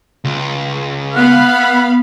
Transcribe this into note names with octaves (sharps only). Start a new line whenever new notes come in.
C#2
B3 F5 F#5 B5